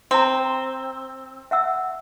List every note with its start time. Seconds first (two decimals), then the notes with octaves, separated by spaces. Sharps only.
0.11 C4 A#5 C6
1.51 E5 F#5 E6